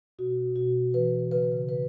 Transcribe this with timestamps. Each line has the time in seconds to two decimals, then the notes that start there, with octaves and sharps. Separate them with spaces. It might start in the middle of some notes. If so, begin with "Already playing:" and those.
0.19 B2 F#4
0.56 B2 F#4
0.94 E3 B4
1.32 C#3 B4
1.69 B4